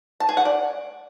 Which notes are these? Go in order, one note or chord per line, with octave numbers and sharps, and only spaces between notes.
A5
G#4
F#5
D5